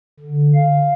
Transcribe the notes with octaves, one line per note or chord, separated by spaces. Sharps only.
D3
F5